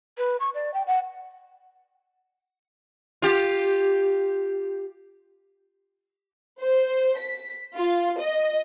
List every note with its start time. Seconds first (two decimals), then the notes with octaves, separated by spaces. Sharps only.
0.18 B4
0.40 C#6
0.55 D5
0.74 G5
0.87 F#5
3.22 F4 G4
6.60 C5
7.18 B6
7.76 F4
8.20 D#5